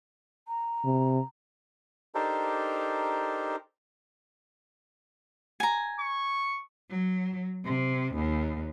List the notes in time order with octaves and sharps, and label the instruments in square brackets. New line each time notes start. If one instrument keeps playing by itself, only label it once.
[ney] A#5
[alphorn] C3
[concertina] D4 D#4 G4 A4 A#4 C5
[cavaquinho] G#5 A#5
[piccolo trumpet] C#6
[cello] F#3
C3
D#2